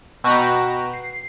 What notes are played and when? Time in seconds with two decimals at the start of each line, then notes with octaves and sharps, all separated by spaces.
0.24 B2 F#4 B4 G5 A#5 E7
0.94 C7